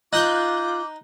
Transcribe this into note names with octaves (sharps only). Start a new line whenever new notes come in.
D#4 F4 D6 F#6 G6